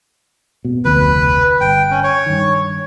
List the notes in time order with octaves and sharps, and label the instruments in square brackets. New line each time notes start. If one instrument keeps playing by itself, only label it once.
[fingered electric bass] B2
[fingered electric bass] F1 D2 [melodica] B4
[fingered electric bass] G1 [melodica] G5
[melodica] C#4
C#5
[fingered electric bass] G2 D#3